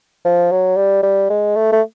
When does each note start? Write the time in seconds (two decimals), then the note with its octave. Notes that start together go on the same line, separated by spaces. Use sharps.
0.25 F3
0.51 F#3
0.76 G3
1.03 G3
1.30 G#3
1.56 A3
1.72 A3